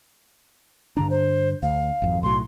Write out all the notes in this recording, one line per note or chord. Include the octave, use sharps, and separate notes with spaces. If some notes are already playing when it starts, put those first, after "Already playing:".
G2 D3 D4 A#5
C5
D2 F5
G#1 F2
B1 A2 F#3 C6